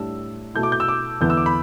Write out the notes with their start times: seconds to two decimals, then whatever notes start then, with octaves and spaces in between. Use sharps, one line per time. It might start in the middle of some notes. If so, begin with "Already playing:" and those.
Already playing: A2 G3 D4 E6
0.55 B2 A3 E4 G6
0.63 D6
0.72 G6
0.80 E6
0.88 D6
1.21 E2 D3 B3 E4 G6
1.30 E6
1.37 D6
1.46 B5